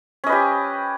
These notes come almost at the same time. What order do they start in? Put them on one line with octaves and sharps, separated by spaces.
C#4 D#5 B4 G4